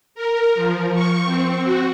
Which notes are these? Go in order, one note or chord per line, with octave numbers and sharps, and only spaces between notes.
A#4
F3
C#6
C4
F#4